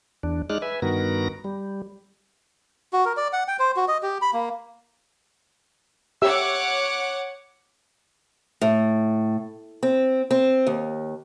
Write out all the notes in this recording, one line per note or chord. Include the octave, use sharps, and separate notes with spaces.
E2 D4
G#3 D#4 D5 F6 F#6
B4 E5 G#5
G2 D#3 B3 F#4 A#4 A#6
G3
F#4
A#4
D5
F#5
G5
C5
F#4
D#5
G4
B5
A#3
G4 C#5 E5 F#5 D6 E6
A2
C4
C4
D#2